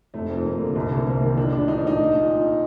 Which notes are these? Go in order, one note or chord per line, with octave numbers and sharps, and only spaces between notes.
F1 A3
F2
F1 A#3
D3
C2
C3
C2 A#3
D#3
A#1 D4
A2 D4
A2 D#4
D4
A#1 D#4
A#1
A#2
A#2